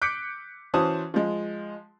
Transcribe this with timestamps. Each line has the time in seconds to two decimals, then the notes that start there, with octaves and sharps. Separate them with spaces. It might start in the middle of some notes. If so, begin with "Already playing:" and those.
0.02 D6 F#6 G6 B6 C#7 D7
0.74 E3 C#4 F#4 C5 A5 D#6
1.14 F3 G#3